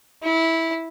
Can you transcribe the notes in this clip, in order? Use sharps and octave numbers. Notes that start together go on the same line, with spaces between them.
E4